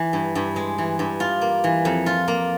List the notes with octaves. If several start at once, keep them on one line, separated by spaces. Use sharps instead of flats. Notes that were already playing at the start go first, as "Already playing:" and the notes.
Already playing: E3
G2
G2
G#3
E3
G2
F4
A#3
E3
F2
F4
A#3